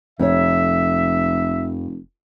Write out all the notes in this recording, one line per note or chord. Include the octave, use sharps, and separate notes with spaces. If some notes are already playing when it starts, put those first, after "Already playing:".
F1 F2 C#5 E5